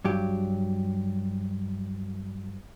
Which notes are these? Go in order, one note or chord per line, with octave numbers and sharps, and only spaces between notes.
G2 F#3 G4